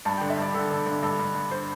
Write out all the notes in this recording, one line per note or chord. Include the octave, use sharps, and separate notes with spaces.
G2 A5
D3 G5
E5
G2 D5
D3 A4
D3 A4
D3
G2 A4
G2
G2
C5